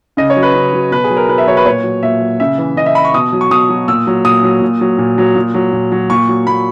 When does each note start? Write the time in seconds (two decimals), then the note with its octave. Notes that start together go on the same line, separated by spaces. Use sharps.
0.17 C#3 D#5
0.30 C#5
0.36 F#3
0.43 B4
0.55 C#3
0.73 F#3
0.91 B2 B4
1.04 G#4
1.10 F#3
1.17 A#4
1.29 B2 B4
1.38 E5
1.47 F#3 C#5
1.57 B4
1.65 A#2 C#5
1.84 F#3
2.03 A#2 E5
2.21 F#3
2.40 C#3 E5
2.58 E3
2.76 C#3 D#5
2.86 E5
2.95 E3 B5
3.05 C#6
3.14 B2 D#6
3.32 F#3
3.41 C#6
3.51 B2 D#6
3.69 F#3
3.88 A#2 E6
4.07 F#3
4.24 A#2 D#6
4.43 F#3
4.61 A#2
4.81 F#3
4.98 A#2
5.18 F#3
5.36 A#2
5.54 F#3
5.72 A#2
5.92 F#3
6.10 A#2 C#6
6.29 F#3
6.47 A#2 B5